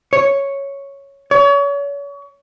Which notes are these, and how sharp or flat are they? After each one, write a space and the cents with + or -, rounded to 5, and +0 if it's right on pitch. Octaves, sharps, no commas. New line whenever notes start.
C#5 +0
C#5 +35